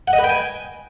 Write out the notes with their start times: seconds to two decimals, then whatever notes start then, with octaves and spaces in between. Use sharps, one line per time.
0.08 F#5
0.13 D#5
0.19 B4
0.24 G5
0.30 G#5